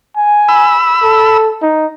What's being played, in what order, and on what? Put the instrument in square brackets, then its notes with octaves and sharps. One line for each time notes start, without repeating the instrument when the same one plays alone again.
[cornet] G#5
[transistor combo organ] B5 E6
[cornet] A4
D#4